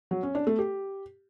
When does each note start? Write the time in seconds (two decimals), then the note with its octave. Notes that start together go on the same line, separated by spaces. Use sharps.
0.11 F#3
0.23 C#4
0.35 D4
0.47 A3
0.59 G4